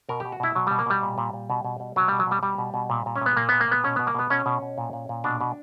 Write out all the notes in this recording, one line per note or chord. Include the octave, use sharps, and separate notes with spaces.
B2 A#4
B2 G4
F#4
B2 E4
B2 F#3
B2 G3
A#3
B2 G3
A#2
A#2
A#2
B2
B2
B2
B2 F#3
B2 G3
F#3
B2 G3
B2 G3
B2
B2
A#2
A#2
C#4
A#2 B3
A#2 A#3
A#2 B3
A#3
A#2 B3
B2 C#4
B2 B3
A#3
B2 B3
B2 C#4
B2
B2
A#2
A#2
A#2
B2 D4
B2